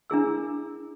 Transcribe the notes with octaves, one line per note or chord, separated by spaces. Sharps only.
D4 E4 G#4 E6